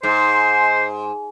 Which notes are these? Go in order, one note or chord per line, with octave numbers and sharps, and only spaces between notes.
G#2 C5